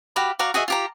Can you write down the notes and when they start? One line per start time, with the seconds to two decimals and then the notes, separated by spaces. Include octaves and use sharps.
0.16 F#4 G4 F5 B5
0.39 F#4 D5 F5 A#5
0.54 F#4 G#4 D#5 E5
0.68 F4 G4 A#5